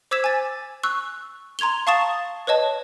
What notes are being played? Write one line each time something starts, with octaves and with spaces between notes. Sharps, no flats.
C5 D6 E6 G#6 B6 E7
G#5 A6
C#6 E6 F#6
A#5 C6 G#6 F7 G7
F5 A5 C#6 D#6 A6 E7
B4 C#5 D#5 A5